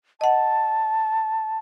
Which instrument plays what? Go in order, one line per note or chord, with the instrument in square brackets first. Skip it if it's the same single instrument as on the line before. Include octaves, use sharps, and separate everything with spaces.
[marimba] D#5 F#5 [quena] A5